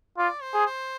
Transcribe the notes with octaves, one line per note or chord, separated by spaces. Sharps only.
F4 D5
C5
G#4
C5